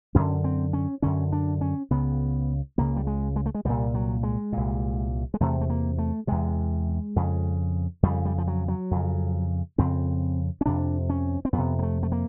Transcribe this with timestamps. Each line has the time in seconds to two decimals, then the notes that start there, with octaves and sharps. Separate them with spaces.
0.15 F#2 D3 C#4
0.44 C4
0.73 C#4
1.02 F#2 D3 C#4
1.32 D4
1.61 C#4
1.90 C#2 C#3 B3
2.78 C#2 C#3 A#3
2.96 G3
3.07 G#3
3.36 G#3
3.46 A3
3.55 G#3
3.65 C2 A#2 G3
3.95 F#3
4.23 G#3
4.52 C2 A#2
5.34 G#3
5.40 E2 C3 A3
5.61 A3
5.70 A#3
5.98 A3
6.27 E2 C3 G#3
7.16 F2 C#3
8.03 F2 C#3 G3
8.25 G3
8.38 F3
8.47 F#3
8.68 F#3
8.91 F2 C#3
9.78 F2 C#3 C4
10.61 C#4
10.66 F2 C3 D4
11.10 C#4
11.45 C4
11.53 F2 B3
11.58 C3
11.79 A#3
11.83 A3
12.03 A3
12.12 A#3